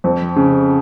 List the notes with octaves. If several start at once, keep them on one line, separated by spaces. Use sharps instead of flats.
F2
C#3